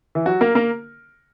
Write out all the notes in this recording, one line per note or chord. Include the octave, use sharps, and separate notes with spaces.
E3 E4
F#3 F#4
A#3 A#4
A#3 A#4